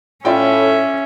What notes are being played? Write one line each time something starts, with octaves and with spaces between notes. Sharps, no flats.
A2 C#4 F4 D5 E5 G5